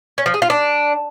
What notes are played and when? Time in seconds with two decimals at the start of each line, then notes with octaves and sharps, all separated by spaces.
0.18 C#4
0.26 F3
0.34 G#4
0.42 F4
0.50 D4